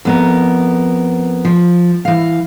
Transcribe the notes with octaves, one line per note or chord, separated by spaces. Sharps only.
F2 B3 A#4
F3
E3 F5